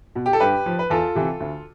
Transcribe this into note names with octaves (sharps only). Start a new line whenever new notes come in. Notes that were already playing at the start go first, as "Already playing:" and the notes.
B2
G4
A4
G2 G4 B4
F3
B4
E2 F4 A4
C3 E3
D2